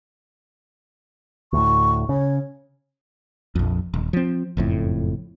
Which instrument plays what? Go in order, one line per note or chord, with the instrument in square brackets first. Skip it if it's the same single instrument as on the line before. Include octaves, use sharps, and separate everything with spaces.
[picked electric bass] D2 A2 [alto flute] C#6
[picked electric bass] C#3 [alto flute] C#5
[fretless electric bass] A#1 F2
D#1
F3 C4
F#1 F2 A2